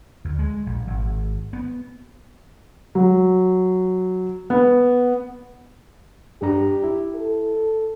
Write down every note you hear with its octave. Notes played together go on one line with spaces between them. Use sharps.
D2
G#3
A#1
G#1
B3
F#3
B3
G2 D4 G4 A#5
E4
A4